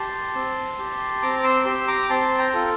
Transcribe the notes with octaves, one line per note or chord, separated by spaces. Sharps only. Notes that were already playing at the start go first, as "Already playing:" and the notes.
Already playing: G4 A5 C6
C4
G4
C4 A#5 D6
C6 E6
G4 C6 E6
A#5 D6
C4 A5 C6
G5 A#5
F4 A4